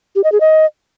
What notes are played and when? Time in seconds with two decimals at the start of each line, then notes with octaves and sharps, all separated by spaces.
0.16 G4
0.24 D#5
0.32 G#4
0.40 D#5